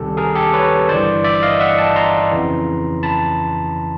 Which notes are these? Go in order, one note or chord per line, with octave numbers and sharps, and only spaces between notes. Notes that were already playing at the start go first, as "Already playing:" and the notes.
Already playing: C#2 C3 D#3 G3 G4 A4
G#4 A#4
G4 A4
B4 C#5
G1 G2 E3 C5 D5
D5 E5
D#5 F5
E5 F#5
G5 A5
A#5 C6
F2 C#3 E3
A5 B5